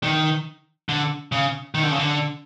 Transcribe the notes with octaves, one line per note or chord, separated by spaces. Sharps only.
D#3
D3
C#3
D#3
D3
C#3
D3